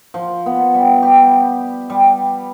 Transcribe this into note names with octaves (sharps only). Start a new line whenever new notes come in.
F3
B3
G3
G4
G3